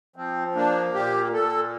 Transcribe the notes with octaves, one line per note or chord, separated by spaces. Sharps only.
F3 C4
A#3 D4
A#2 G4
A#2 A4